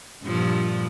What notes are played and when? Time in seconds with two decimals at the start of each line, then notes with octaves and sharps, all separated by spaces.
0.24 G2 A#2 F3